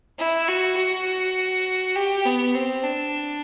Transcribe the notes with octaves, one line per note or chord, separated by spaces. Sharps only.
E4
F#4
F#4
G4
B3
C4
D4